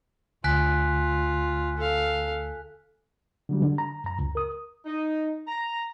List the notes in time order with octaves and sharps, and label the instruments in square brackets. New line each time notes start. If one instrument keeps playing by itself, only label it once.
[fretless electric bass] D2 [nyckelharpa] F4 [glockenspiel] G#5 F#6 B6
[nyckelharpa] A4 F5
[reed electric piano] D3 F#3 G3
D3
A#5
F#2 A#5
C#2
A#4 D#6
[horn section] D#4
A#5